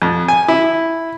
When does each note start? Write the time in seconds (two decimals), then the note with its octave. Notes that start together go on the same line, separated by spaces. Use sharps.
0.02 F2
0.28 G#5
0.48 E4